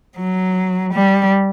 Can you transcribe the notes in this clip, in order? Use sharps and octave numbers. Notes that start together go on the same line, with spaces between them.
F#3
G3